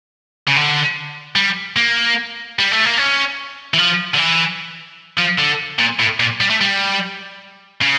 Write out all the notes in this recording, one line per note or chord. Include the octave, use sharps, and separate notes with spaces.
C#3
D3
G3
A#3
G3
A3
A#3
C#4
E3
F3
D3
E3
F3
D3
A#2
A2
A#2
G3
A3
G3
C#3